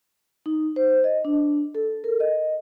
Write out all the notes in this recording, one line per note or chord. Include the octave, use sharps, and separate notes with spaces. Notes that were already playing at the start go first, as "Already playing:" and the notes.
D#4
C5
D#5
D4
A4
A#4
D#5